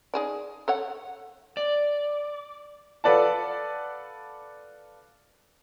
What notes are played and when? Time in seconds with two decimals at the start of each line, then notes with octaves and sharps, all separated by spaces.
0.14 D#4 G#4 D5
0.68 A4 C#5 F#5
1.57 D5
3.04 F4 A4 B4 D5 F#5 A5